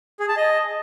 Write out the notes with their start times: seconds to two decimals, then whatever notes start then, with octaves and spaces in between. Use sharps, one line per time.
0.20 G#4
0.28 A5
0.37 D#5